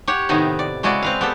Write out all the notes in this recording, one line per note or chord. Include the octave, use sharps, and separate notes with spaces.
G4 C#5 F#5
A2 C3 D#3 B3 D#4
D5
C#3 G#3 E4 F#4 D5
C4 B4 F5
B3 G4 A4